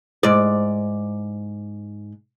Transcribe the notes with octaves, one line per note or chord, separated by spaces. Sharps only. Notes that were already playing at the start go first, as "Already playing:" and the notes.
G#2 D5